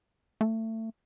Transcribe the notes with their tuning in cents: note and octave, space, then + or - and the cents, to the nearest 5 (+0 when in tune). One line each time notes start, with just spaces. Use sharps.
A3 +25